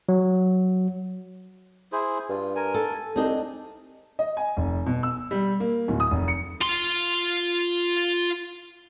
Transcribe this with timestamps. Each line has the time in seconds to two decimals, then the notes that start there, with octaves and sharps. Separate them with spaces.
0.09 F#3
1.92 E4 G#4 C5
2.29 G2 F4
2.56 A#4 G#5
2.74 A4
3.16 C2 C4 D4 D#4 G#4
4.19 D#5
4.37 G#5
4.57 F1
4.86 B2
5.03 E6
5.31 G3
5.60 A#3
5.88 D1
6.00 D#6
6.11 F1
6.28 C#7
6.62 F4 C6